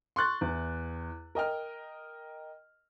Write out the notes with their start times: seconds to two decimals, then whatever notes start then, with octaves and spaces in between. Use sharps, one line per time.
0.16 C6 C#6 F#6 A6
0.41 E2
1.35 A#4 D#5 G5 F6